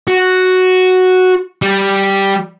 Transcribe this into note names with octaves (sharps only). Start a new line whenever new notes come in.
F#4
G3